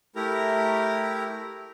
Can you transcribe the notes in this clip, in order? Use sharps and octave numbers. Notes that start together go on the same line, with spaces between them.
A3 E4 G4 A#4 A#5